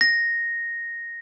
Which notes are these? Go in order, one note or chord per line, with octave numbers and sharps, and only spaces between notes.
A#6